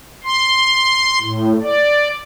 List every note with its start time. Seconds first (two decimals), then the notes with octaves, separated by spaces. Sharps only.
0.24 C6
1.21 A2
1.61 D5